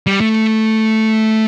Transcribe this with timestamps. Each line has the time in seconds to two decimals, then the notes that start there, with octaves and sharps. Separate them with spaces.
0.07 G3
0.21 A3